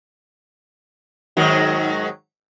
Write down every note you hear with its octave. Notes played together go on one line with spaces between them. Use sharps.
G#2 D#3 F#3